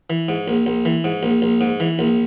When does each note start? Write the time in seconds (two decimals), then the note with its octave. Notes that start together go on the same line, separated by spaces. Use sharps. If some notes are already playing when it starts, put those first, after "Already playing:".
0.10 E3
0.29 G#2
0.48 A#1
0.66 A#1
0.85 E3
1.04 G#2
1.23 A#1
1.42 A#1
1.61 G#2
1.80 E3
1.99 A#1